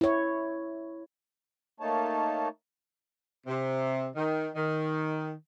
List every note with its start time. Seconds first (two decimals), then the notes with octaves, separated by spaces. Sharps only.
0.01 E4 C#5
1.80 A3 A#3 D#4 C#5 A5
3.47 C3
4.16 D#3
4.56 D#3